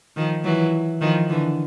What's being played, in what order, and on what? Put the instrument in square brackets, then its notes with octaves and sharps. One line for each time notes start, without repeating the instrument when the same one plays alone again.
[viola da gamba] D#3 F3
E3 F#3
D#3 F3
D3 E3